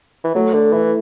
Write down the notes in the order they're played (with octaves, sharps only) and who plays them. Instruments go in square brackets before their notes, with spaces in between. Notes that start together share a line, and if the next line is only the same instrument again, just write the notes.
[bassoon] E3
[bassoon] F#3 [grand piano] A3
[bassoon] D3
[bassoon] E3 [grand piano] E4